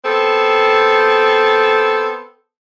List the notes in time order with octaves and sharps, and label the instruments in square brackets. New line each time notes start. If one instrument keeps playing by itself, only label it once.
[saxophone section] B3 C4 A4